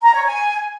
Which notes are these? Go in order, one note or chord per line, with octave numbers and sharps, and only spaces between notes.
A#5
C#5
G#5